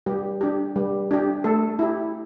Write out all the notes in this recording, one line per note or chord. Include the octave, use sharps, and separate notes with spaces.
G3 G4
D4 G4
G3
D4 G4
A3 A4
E4 G4